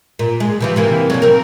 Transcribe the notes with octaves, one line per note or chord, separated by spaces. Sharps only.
A#2
G#3
C3 E3 F3
C3 E3 A#3
B2 D3 F#3
C4 A#4